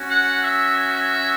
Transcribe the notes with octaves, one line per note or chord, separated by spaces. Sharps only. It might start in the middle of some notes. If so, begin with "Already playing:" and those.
Already playing: C#4 F#4
F#5
E5